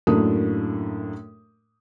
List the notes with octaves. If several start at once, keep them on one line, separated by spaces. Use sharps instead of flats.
F#2 A2 A3 A#3 D4 D#6